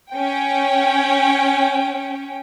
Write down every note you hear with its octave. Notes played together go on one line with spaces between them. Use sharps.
C#4 G5